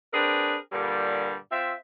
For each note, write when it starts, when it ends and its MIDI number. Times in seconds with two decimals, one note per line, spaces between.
0.14 0.57 60
0.14 0.57 62
0.14 0.57 68
0.14 0.57 70
0.14 0.57 71
0.71 1.36 43
0.71 1.36 46
0.71 1.36 50
0.71 1.36 55
1.51 1.73 60
1.51 1.73 65
1.51 1.73 76